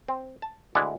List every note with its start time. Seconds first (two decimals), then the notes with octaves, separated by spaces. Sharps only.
0.08 C4
0.42 A5
0.75 D2 G#3 E4 D5 F#5